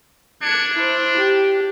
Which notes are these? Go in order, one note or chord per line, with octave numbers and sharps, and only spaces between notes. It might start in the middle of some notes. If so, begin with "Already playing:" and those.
D4 G#6 C#7
E4 C5
G4